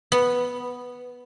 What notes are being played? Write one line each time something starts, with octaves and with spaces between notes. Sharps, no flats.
B3